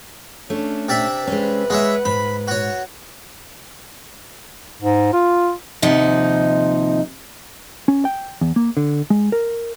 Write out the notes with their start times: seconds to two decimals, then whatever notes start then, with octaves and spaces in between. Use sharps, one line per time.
0.50 A3 C#4 D4
0.88 C3 D5 E5
1.27 G#3 C#4 B4
1.70 G#3 C#5 E5 F#5
2.05 G#2 B5
2.48 F#4 C#5
4.82 G#2
5.13 F4
5.82 D#2 C3 F3 D#4 F#5
7.88 C#4
8.05 G5
8.41 E2
8.56 A#3
8.77 D3
9.10 G#3
9.32 A#4